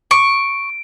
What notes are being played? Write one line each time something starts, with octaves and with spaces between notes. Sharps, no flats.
C#6 D7